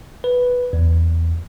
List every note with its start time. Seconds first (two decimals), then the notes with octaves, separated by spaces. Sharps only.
0.24 B4
0.73 E2